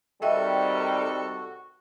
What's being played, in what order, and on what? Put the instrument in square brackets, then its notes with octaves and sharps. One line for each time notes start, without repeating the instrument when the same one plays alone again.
[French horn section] C3 D#3 G3 [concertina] F#4 [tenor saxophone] A4 [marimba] D#5 E5 G5